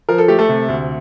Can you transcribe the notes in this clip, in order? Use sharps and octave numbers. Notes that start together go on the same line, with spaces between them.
F3 A#4
A4
A3 G4
A3 A4
C3
D2